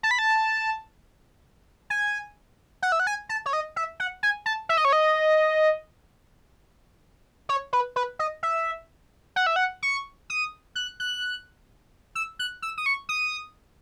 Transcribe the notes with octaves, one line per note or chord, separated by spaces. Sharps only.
A5
B5
A5
G#5
F#5
E5
F#5
G#5
A5
C#5
D#5
E5
F#5
G#5
A5
E5
D#5
C#5
D#5
C#5
B4
B4
D#5
E5
F#5
E5
F#5
C#6
D#6
F#6
F#6
E6
F#6
E6
D#6
C#6
D#6